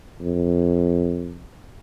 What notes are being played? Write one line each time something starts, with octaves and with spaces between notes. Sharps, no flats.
F2